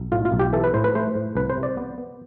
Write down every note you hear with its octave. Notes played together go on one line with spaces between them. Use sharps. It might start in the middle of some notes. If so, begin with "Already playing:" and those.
Already playing: B1
A2 F4
F4
B1
G4
E3 A4
B4
A2 C5
B4
A3 C5
A2
C2 B4
C5
C3
D5
B3
B3